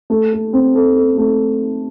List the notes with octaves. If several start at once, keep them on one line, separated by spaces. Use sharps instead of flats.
A3
A4
C4
A4
A4
A3